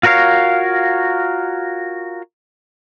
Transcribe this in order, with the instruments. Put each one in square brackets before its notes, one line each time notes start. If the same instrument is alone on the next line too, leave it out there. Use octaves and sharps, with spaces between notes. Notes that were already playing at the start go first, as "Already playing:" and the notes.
[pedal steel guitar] F4 F#4 A#4 C#5 F5